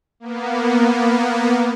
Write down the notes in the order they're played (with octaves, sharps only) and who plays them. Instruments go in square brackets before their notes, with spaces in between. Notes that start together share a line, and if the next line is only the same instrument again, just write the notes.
[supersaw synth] A#3 B3